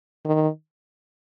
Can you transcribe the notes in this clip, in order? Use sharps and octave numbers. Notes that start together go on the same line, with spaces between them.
D#3